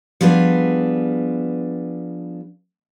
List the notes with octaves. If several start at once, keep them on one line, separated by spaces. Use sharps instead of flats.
F3 G3 B3 D4 G#4 B4